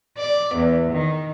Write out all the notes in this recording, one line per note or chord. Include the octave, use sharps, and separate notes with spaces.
D5
E2
D#3